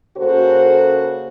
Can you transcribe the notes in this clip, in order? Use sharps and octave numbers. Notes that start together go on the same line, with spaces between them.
C#3 A#3 F#4 A4 C5